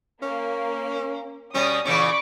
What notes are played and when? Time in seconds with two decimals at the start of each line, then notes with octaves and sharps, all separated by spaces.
0.22 A#3 C#4
1.55 B2 G3 C#4 D#6
1.85 A#2 C#3 E3 C#4 B5 C#6 D6